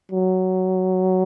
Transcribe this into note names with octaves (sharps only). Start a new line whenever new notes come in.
F#3